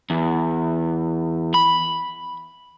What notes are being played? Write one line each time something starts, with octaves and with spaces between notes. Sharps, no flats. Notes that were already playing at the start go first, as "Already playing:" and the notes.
E2
B5